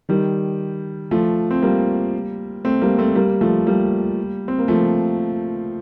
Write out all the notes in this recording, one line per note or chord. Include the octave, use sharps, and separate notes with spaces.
D#3 G3
F3 A3
C4
G3 A#3
A3 C4
G3 A#3
A3 C4
G3 A#3
F3 A3
G3 A#3
C4
A#3
F3 A3